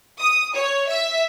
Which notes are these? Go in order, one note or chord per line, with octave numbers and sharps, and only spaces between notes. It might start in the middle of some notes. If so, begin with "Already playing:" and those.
D#6
C#5
E5